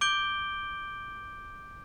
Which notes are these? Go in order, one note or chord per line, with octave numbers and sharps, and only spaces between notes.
D6 G6 D7 G7